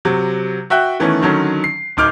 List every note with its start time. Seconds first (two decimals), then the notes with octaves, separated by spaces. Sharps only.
0.05 C3 F#3
0.70 F#4 E5 G5 F#6
1.00 D#3 E3 A3 B3 C#4
1.21 D3 D#3 F#3 C#4
1.64 C7
1.97 D1 D#4 D6 F6 G6